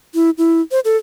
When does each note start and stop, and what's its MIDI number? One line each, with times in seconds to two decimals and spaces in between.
0.15 0.30 64
0.38 0.61 64
0.71 0.80 72
0.85 0.97 69